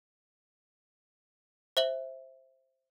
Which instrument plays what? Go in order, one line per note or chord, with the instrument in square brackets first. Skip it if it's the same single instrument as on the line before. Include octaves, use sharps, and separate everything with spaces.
[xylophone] C5 E5 F#7